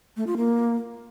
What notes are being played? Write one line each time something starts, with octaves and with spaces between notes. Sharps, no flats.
A3
F4
A#3